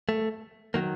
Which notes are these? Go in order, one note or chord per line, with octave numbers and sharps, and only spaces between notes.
A3
D#3 F#3 A#3